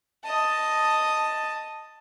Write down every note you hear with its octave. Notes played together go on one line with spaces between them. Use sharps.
D#5 A5